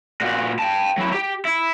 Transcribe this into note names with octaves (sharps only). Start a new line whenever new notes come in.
A#2 F#4
G5 A5
F#3 E4
G4
E4